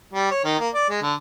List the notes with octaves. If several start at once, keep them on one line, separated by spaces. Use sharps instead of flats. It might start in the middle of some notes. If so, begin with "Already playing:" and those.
G3
C#5
D#3
A#3
D5
G#3
D3